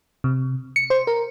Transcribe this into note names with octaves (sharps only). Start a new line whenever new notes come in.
C3
C#7
C5
A#4